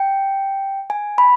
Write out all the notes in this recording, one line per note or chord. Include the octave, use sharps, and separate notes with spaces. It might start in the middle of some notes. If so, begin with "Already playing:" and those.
Already playing: G5
G#5
B5